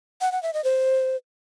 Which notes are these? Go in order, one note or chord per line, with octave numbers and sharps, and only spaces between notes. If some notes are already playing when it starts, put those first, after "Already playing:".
F#5
F#5
E5
D#5
C5